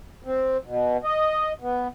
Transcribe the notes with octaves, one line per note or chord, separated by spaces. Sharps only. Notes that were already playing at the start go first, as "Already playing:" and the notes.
C4
B2
D#5
B3